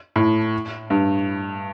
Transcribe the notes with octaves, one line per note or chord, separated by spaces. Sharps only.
A2
G2